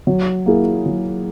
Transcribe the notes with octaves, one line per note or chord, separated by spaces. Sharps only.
F#3
A#3 E4 G#4
F#3